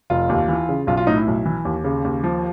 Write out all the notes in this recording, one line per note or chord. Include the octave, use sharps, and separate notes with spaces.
F1 F4
D#2
E3
C#3
B1 F4
F4
A2 D#4
E4
B1
E3
D#2
C#3
D#2
F3